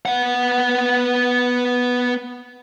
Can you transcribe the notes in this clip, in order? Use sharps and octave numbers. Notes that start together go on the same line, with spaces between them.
B3 F#5